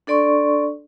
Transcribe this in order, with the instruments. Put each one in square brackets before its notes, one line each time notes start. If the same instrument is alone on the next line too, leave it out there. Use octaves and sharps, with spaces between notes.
[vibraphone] D4 A4 D5 C6 C#6